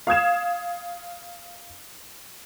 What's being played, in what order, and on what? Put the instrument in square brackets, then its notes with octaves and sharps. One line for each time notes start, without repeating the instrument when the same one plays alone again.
[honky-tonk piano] F5 D#6 G#6 E7